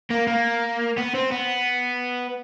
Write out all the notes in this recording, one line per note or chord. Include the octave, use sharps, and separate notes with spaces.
A#3
A#3
B3
C4
B3